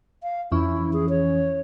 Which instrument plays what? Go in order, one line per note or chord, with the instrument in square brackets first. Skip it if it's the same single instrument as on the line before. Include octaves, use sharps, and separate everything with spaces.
[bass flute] F5
[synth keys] F2 E3 C#4 [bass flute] E4
[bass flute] G#4
C#5